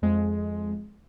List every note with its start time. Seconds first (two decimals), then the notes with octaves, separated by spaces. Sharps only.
0.02 F2 G#3